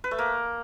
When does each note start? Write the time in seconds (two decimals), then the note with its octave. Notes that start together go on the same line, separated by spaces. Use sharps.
0.04 B4
0.11 A3
0.19 A#3